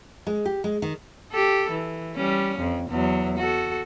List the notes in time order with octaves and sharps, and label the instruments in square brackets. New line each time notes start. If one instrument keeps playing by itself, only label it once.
[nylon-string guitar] G#3
G4
G#3
D#3
[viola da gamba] G4 A4
E3
G3 C#4
F2
E2 F#3
F#4 A4